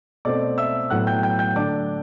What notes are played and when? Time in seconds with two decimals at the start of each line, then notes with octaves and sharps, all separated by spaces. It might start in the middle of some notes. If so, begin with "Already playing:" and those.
0.25 B2 A3 C4 D5 D6
0.58 E5 E6
0.90 A2 F#3 B3 F#5 F#6
1.07 G5 G6
1.23 G5 G6
1.39 G5 G6
1.56 D3 A3 D4 D5 D6